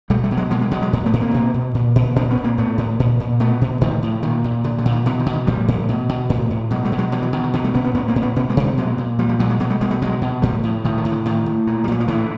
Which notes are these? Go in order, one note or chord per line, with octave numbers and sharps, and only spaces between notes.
B2 G3 A3
G3 A3
B2
F#3 G#3
B2 G#3 A#3
G#3 A#3
B2 F#3 G#3
F#3 G#3
A2
A3 B3
A2
A#3 C4
B2
B2
A#2
A#2
A#2 C4 D4
B3 C#4
A#2
A#3 C4
A2 A3 B3
A2
A#2
A#2
B2 A3 B3
B2
A2 D#3 F3
A2
A#2 D#3
A#2
A#2 D3
D3
A#2
D#3
B2 D3 E3
D#3
B2
D#3
A2 F3 G3
A2
B2
B2
A2
A2
B2 F#3 G#3
G3 A3
B2
F#3 G#3
B2 F3 G3
E3 F#3
B2 D#3
D#3
B2 D3 E3
G3 A3
B2 B3 C#4
B3 C#4
A2 B3 C#4
A#3 C4
A2
B3 C#4
B2 B3 C#4
G#3 A#3
B2
G3 A3
A#2 F#3 G#3
A#2
A#2 F3 G3
F3 G3
A#2 F#3 G#3
F#3 G#3
B2 F#3 G#3
G3 A3
B2 G#3 A#3
G3 A3
B2 F#3 G#3
B2
A2 F3 G3
A2
A2 D#3
D#3
A2
D3
A2 D#3
A2
A#2
G3
A#2 F#3
F3
A2 D3 E3